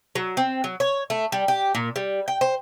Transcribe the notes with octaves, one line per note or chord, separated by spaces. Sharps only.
F#3
C4
F#3
C#5
A3
G3
G4
A#2
G3
G5
C5